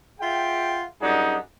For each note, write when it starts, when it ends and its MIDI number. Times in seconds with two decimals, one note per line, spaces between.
0.20 0.83 65
0.20 0.83 68
0.20 0.83 76
0.20 0.83 78
0.20 0.83 79
1.01 1.37 42
1.01 1.37 55
1.01 1.37 62
1.01 1.37 63
1.01 1.37 68
1.01 1.37 78